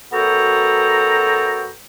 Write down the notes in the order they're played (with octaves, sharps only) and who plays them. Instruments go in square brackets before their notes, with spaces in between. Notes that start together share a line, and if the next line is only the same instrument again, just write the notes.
[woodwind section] F#2 B3 F#4 A4 G5 A#5